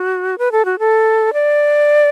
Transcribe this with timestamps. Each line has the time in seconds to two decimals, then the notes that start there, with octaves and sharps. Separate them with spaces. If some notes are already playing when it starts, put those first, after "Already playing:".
Already playing: F#4
0.38 B4
0.52 A4
0.65 F#4
0.79 A4
1.33 D5